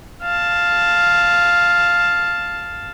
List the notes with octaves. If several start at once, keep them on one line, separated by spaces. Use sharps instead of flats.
F5 A5